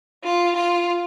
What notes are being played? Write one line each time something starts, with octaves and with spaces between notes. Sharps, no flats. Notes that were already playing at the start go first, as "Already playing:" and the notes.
F4
F4